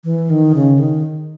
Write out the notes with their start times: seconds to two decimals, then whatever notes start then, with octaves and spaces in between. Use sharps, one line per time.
0.04 E3
0.30 D#3
0.55 C#3
0.79 D#3